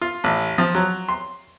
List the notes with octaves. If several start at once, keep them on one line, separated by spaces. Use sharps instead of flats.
F4
A1
F3
F#3
C6